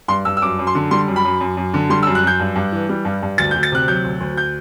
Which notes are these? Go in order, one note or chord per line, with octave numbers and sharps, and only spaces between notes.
G2 C6
G2 E6
E6
F#2 D6
F#2
C6
D3
G3 C6
F#2
B5
F#2
F#2
F#2
D3
G3 C6
E6
F#2
F#6
F#2 G6
G2
G2
E3
G3
G2
G2
D2 A6
G6
D2
A6
C3 F#6
F#3 G6
D2
D2
G6